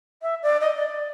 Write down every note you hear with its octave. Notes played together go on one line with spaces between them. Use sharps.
E5
D5
D#5
D5